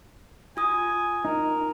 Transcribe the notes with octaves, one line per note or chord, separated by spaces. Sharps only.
F4 G#5 D#6
D#4 A#4